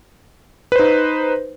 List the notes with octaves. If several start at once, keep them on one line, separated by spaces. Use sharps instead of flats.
D#4 B4 C5